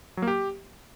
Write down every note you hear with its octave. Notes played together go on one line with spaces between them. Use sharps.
F#3
A#3
G4